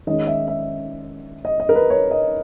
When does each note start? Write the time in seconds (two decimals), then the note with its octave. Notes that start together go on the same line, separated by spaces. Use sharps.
0.07 D#3 G#3 C#4 D#5
0.27 E5
0.48 E5
1.45 D#5
1.60 D#5
1.69 A#4
1.75 B4
1.90 C#5
2.11 D#5